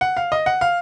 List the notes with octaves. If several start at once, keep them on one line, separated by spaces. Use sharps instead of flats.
F#5
F5
D#5
F#5
F5